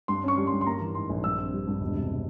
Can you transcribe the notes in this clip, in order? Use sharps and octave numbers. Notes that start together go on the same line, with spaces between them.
G2 C6
C#4 C#6
G3
C6
G2
C6
A#3 A#5
E3
G#2 C6
A#1
G2 E6
C4
G3
G2
E1
C3